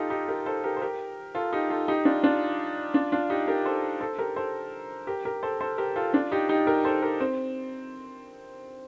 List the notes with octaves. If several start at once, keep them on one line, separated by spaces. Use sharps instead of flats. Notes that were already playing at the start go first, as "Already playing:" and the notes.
Already playing: D#4 F4 G4 A4
D#4 G4
G4 A#4
A4 C5
G4 A#4
C5
G4 A#4
F4 A4
D#4 G4
F4 A4
D#4 G4
D4 F4
D4 F4
D4 F4
D4 F4
D#4 G4
G4 A#4
A4 C5
A4 C5
G4 A#4
A4 C5
G4 A#4
G4 A#4
A4 C5
A4 C5
G4 A#4
F4 A4
D4 F4
D#4 G4
D#4 G4
G4 A#4
A4 C5
G4 A#4
C4